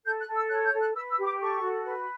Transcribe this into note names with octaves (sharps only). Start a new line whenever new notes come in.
A4 G6
F#6
A4
E6
C#5 F#6
G6
A4
F#6
B4 E6
E6
G4
D6
A4 C#6
F#4
B4